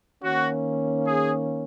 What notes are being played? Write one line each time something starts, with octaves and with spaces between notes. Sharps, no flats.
D#3 A#3 C#4 F#4
G#4